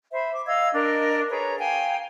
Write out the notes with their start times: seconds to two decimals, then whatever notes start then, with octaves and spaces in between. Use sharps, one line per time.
0.12 C5 E5 B5
0.33 D6
0.47 D#5 F5 E6 G#6
0.75 D4 A#4 D#5
1.30 G#4 B4 C#5 A#5
1.59 F5 G5 G#5